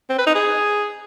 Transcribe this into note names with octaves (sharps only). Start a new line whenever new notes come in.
C4
B4
D#4
G#4